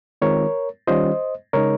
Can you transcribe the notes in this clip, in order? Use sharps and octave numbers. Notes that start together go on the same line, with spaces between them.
D#3 G#3 C4 F4 A#4 C#5
D#3 G3 C#4 F4 C5 D#5
C#3 G#3 D#4 A#4 C#5